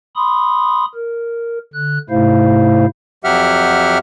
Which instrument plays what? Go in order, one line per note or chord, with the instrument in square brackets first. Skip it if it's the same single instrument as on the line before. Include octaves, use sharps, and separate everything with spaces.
[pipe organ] B5 C6 D#6
A#4
D3 F#6
G#2 C3 A3 E4 C5 F5
[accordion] F2 F#3 G4 E5 F#5 F6